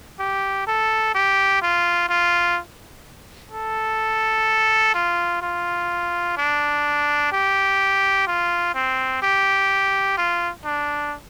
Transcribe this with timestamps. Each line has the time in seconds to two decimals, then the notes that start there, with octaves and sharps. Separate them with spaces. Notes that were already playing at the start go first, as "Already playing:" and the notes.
0.20 G4
0.67 A4
1.15 G4
1.62 F4
2.09 F4
3.52 A4
4.94 F4
5.42 F4
6.37 D4
7.32 G4
8.27 F4
8.75 C4
9.22 G4
10.18 F4
10.65 D4